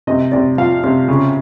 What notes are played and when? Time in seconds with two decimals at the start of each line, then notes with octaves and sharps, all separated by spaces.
0.07 C3 D#5
0.32 C3 D5
0.58 F3 F5
0.84 C3
1.08 C#3